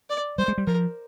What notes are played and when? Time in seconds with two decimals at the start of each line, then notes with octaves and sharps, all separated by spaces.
0.10 D5
0.38 G3 C5
0.48 G#3
0.58 G3
0.67 F3 A#4